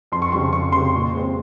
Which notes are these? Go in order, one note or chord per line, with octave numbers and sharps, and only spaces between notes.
F2 C6
C#6
C#3 G3 C4 C6
F2 C#6
C#3 G3 C4 C6
A#2
G#3 C4